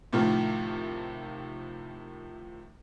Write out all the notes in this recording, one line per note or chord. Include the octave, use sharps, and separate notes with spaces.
A2 C3 D#3 F3